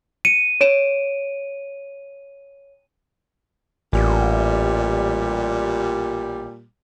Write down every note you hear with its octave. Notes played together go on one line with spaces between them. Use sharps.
C#7 D#7
C#5 D7 E7
A1 A#2 G3